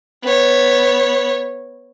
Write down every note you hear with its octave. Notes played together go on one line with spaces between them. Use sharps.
B3 C#5